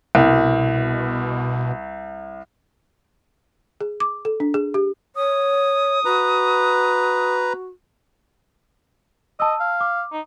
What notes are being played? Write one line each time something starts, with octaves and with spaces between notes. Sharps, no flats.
C2 B2
G#4
D6
A4
D4
G#4
G4
C#5 D#6
F#4 B4 A#5
D#5 A5 E6
F5
D6
D#4